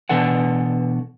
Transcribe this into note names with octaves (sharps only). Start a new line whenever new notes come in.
B2 E3 D4 A4 F#5